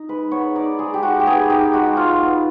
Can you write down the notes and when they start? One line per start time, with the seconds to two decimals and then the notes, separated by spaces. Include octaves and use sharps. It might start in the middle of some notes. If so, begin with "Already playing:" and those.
Already playing: D#4
0.09 G#3 B4
0.31 B3 C#5
0.55 D#4 D5
0.79 G#3 G#4
0.94 G4
1.03 G#3 F#4
1.20 G4
1.26 B3 G#4
1.50 D#4 G4
1.73 G#3 F#4
1.97 F#3 F4
2.21 B3